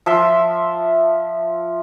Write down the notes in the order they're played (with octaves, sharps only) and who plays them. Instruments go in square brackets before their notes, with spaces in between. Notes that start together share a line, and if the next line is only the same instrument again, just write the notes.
[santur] F3 E5 C6